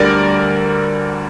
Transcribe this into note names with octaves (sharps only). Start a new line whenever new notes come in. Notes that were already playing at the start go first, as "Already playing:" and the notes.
Already playing: D2 D3 G3 A#4 D5